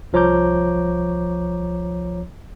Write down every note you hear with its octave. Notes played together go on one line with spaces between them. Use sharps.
C2 F3 C#5 A#5 D6 G6